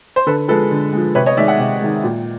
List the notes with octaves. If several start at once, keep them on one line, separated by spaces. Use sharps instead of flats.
C5
D3 A4 B4
F3 G#3 A4 B4
D3
F3 G#3
C3 B4 C#5
C#5 D#5
D#3 G#3 D5 E5
E5 F#5
C3
D#3 G#3
A#2